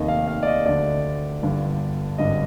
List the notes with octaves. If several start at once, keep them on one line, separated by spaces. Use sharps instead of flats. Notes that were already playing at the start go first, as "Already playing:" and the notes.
Already playing: F1 D#2 D#3 D#5
F5
F5
D5
D#5
D2 D3 D5
G1 G2 D3
G#1 G2 D3 D#5